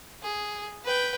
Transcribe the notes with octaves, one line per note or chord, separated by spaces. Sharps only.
G#4
B4 G5